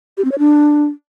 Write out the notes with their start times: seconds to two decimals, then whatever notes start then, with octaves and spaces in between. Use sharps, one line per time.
0.18 G4
0.25 C4
0.32 C#5
0.39 D4